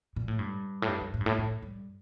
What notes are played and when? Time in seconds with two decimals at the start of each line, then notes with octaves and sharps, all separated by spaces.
0.16 A#2
0.28 A2
0.39 G2
0.82 A2
0.88 G2
1.01 G2
1.14 A2
1.21 G2
1.26 A2
1.38 A2
1.63 G2